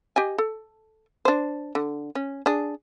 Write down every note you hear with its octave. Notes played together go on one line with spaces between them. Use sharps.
G4 D#5 G#5
A4
D4 C5
D3
C#4
D4 G#4